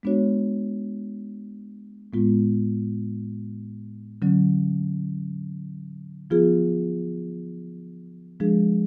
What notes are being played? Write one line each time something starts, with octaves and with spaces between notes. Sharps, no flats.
G#3 B3 D4 F#4 C#5
A2 G#3 B3 F4
D3 F#3 C#4
F3 B3 F4 G#4
F3 G#3 D4 G#4